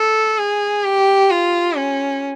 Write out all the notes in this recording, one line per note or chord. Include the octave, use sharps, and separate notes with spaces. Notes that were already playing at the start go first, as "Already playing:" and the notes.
Already playing: A4
G#4
G4
F4
C#4